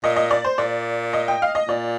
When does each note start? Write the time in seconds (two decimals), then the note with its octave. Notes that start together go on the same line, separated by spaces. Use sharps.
0.03 A#2 D#5
0.16 D#5
0.31 D5
0.44 C5
0.58 A#2 D5
1.13 D#5
1.28 G5
1.42 F5
1.55 D#5
1.68 A#2 D5